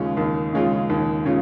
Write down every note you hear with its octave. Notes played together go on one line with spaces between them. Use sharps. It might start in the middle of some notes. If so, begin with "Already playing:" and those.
Already playing: D#2 C#3 G#3 C#4 F4
D#2
C#3 G#3 C#4 F4
D#2
C#3 G#3 C#4 F4